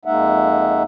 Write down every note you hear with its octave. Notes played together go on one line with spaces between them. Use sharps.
F2 G#3 A#3 D#4 E5 F#5